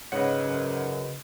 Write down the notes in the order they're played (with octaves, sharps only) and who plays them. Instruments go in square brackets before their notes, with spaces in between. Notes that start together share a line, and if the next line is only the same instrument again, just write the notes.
[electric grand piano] G#2 F#5 [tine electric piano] C#3 B4 D#5 [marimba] C#5
[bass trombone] F#2